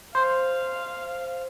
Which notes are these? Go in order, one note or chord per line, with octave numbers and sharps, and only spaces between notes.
C5 F5